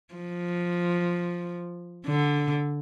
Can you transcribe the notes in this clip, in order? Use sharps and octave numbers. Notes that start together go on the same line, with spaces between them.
F3
D3